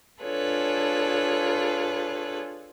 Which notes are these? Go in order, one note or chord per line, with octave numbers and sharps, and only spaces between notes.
D4 F4 G#4 A4 B4 C#5